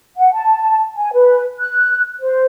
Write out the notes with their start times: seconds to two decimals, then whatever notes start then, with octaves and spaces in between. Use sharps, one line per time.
0.17 F#5
0.33 A5
0.95 G#5
1.13 B4
1.58 F#6
2.21 C5